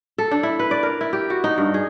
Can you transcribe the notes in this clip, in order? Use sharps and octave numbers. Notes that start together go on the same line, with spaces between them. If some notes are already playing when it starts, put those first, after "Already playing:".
A4
D4
E4
B4
D5
A#4
E4
G4
F#4
D#4
G2
G#4